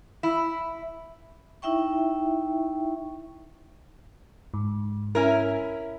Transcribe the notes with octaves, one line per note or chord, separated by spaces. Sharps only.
E4
D#4 E4 E5 G5 C#6
G#2
C#4 E4 A#4